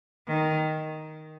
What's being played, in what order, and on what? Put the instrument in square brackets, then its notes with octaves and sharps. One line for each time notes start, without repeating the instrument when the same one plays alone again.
[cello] D#3